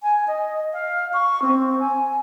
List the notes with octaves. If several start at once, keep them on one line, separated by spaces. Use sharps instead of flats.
G#5
D#5
F5
C#6
C4
G#5